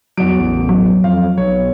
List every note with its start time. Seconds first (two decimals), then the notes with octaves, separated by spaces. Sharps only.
0.17 E2 F#3 D7
0.40 A1
0.69 F#3
1.04 F2 F5
1.38 B1 C#5